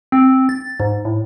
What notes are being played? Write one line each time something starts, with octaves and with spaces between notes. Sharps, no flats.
C4
A6
G#2
A2